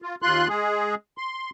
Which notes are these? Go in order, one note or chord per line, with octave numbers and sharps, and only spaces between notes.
F4
D#2 F4 C6 F#6
G#3 G#4
C6